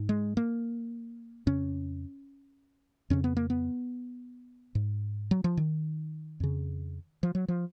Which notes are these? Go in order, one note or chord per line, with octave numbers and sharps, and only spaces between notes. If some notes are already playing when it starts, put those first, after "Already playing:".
Already playing: G#2
G#3
A#3
F2 C#3 C#4
F2 C#3 C#4
B3
A#3
B3
G#2
F#3
F3
D#3
F2 C#3
F3
F#3
F3